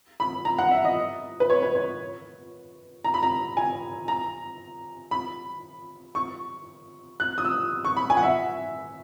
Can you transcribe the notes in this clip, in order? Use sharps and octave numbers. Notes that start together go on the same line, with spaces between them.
B5
A#5
F#5
E5
D#5
B4
C#5
B4
C#5
A#5
B5
A#5
G#5
A#5
B5
C#6
F#6
D#6
E6
C#6
B5
G#5
F#5
E5